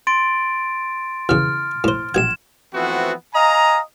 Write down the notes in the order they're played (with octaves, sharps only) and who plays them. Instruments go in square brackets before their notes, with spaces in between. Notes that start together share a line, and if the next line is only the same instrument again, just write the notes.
[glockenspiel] C6 A6 D7
[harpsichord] E2 C#3 [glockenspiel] F6
[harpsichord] A2 C5
[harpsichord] A#1 F#5 [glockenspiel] G#6 E7
[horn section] E3 F3 A3 B3 C4 F#4
D#5 F5 G#5 A#5